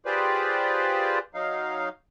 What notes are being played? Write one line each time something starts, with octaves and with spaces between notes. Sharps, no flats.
F4 G4 G#4 B4 C5 D5
F#3 D#4 F5